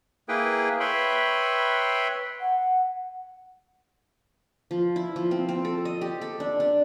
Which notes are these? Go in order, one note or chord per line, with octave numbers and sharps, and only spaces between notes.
A#3 E4 G#4 B4 G5
B4 C#5 E5 G5 B5 C6
F#5
F3
E4
F3
C4
C4
A4
D#5
G4
A4
D4
D4